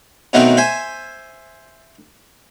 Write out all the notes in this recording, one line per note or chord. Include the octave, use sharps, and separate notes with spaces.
B2 D#3 F#3 A3 C4 A#4
C5 E5 G#5